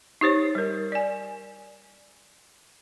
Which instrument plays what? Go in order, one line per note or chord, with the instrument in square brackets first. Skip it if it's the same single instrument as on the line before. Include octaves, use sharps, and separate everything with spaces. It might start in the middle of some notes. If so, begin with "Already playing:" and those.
[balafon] D#4 G4 C5 C#5
G3 A#4
D5 G#5